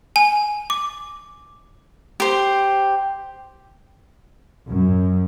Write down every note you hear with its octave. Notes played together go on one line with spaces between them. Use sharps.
G#5
D6
G4 C5
F#2